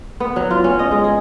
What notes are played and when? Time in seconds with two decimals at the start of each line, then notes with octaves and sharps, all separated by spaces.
0.20 B3
0.36 F#3
0.51 F4
0.64 C#4
0.79 D#5
0.91 G#3
1.04 G#4